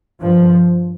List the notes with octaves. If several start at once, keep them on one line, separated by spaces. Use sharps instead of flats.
G2 F3